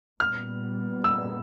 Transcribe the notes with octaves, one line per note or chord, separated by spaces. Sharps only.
A#2 G3 B3 F6
E6